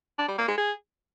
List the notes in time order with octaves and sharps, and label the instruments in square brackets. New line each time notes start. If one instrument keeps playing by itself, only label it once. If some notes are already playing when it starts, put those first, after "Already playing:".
[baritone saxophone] D4
G3
A#3
G#3
G#4